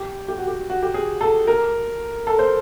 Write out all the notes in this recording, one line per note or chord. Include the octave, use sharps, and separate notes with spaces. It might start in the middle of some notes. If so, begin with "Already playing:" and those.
Already playing: G4
G4
F#4
G4
F#4
G4
G#4
A4
A#4
A4
C5